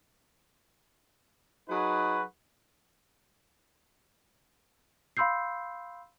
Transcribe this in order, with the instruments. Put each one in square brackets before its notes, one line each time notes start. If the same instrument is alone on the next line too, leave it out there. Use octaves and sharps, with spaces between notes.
[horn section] F#3 D#4 F#4 G#4 B4
[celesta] F5 B5 C6 E6 G6 C7